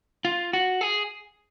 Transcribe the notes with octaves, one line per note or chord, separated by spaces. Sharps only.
F4
F#4
G#4